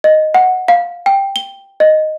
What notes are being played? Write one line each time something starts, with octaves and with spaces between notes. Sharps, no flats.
D#5
F#5
F5
G5
G7
D#5